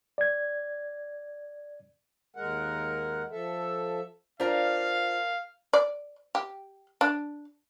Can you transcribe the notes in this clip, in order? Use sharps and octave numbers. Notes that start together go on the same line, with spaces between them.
D5 G#6
D#2 G#3 A#4 F#5
F3 A4 E5
D4 F4 A#4 C5 F5
D5
G4
D4